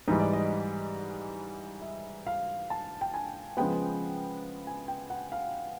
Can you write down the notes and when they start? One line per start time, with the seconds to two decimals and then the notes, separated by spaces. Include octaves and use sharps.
0.08 G#2 E3 G3 D#5
0.20 D5
0.33 D#5
1.82 E5
2.27 F5
2.70 A5
3.01 G5
3.14 G#5
3.57 C#3 F3 G#3 B3 G5
4.67 G#5
4.88 G5
5.10 F#5
5.32 F5